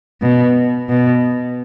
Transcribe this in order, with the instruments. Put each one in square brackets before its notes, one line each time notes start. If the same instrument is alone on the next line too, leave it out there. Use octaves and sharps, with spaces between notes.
[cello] B2
B2